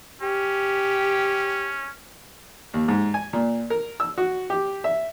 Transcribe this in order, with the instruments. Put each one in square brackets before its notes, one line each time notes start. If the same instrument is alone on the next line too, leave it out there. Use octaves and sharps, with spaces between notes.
[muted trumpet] C#4 [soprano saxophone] G4
[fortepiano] D#2
G#2
G#5
A#2
A#4
E6
F#4
G4
E5